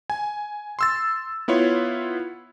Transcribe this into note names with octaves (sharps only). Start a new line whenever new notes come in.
G#5
C6 E6 A6
B3 E4 F4 C#5